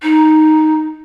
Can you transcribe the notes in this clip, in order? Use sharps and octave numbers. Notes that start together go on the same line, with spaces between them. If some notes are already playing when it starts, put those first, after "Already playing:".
D#4